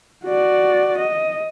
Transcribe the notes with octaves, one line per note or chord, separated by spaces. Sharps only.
F#4 D5
D#5